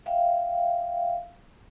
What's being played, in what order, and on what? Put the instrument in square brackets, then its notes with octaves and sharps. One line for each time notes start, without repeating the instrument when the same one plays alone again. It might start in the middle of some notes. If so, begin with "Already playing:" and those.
[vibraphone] E5 F5 G5